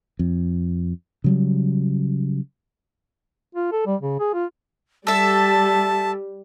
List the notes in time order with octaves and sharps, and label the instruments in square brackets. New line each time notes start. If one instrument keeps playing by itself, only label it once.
[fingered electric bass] F2
C#3 F#3 G3
[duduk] F4
A4
G3
C#3
G#4
F4
[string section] G3 [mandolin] A4 E5 [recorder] A5